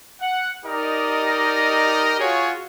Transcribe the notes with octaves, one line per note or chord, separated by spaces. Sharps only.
F#5
D#4 G4 A#4 D5 D#5
F4 F#4 G#4 C#5